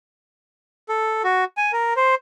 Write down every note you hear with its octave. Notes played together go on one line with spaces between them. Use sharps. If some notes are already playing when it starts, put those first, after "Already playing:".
A4
F#4
G#5
A#4
C5